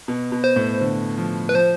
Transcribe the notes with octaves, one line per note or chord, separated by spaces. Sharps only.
B2
B2
C5
A2
D3
F3
B4
F3 C5